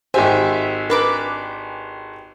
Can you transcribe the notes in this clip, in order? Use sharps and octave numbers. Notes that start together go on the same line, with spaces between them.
G#1 G4 C5 E5 G#5
D4 A#4 B4 D6